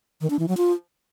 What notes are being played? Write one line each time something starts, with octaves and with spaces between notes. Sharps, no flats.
D#3
D4
E3
F#3
F4